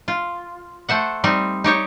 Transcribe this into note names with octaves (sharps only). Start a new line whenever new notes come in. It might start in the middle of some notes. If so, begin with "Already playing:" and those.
F4
A3 C5 E5 F#5
G3 C4 D#4
D#4 G4 C#5